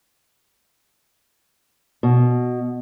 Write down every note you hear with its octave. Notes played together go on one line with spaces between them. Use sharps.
B2